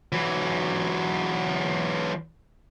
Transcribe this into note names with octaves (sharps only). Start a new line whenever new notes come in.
E3 F#3